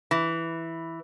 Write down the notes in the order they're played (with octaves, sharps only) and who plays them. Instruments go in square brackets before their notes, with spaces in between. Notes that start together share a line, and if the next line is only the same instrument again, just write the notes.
[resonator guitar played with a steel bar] E3